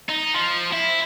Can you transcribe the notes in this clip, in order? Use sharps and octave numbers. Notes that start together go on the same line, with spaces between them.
D#4
F3
E4